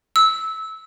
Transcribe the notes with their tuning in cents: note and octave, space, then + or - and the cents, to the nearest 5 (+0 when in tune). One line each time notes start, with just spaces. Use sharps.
E6 -20